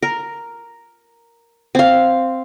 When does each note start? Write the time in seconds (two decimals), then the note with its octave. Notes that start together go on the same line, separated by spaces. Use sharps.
0.02 A#4
1.75 C4 F5